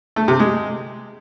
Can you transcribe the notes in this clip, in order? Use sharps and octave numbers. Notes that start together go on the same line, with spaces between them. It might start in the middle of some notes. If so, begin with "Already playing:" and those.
A3
C3
G#3